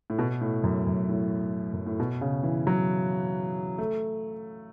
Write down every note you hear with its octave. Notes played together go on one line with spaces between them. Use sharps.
A2
B2
A2
F#2
F#2
A2
F#2
A2
B2
C#3
E3
F#3
A3